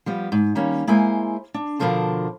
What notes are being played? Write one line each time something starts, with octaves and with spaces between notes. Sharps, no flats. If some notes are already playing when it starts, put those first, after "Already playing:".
F3 G3 B3
G#2
D#3 G3 A#3 C#4
G#3 A#3 E4 C5 G#5
D4
B2 D3 F3 A#4 C5 A5